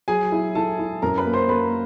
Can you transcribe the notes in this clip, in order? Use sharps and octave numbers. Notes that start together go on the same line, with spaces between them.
F#3 G#4 G#5
E4
E4 A4 A5
E4
F#2 A#4 A#5
B4 B5
A#3
C5 C6
A#3 B4 B5